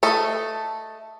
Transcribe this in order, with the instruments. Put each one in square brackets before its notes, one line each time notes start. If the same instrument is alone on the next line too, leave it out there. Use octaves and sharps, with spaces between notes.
[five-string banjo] A3 A4 D#5